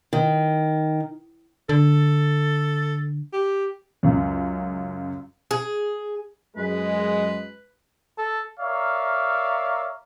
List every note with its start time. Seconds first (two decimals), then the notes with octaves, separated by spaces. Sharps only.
0.13 D#3
1.69 D3 A4
3.33 G4
4.03 C#2 F#2
5.51 G#4
6.57 F#2 G#3 B4
8.18 A4
8.60 A#4 C#5 D5 E5 F5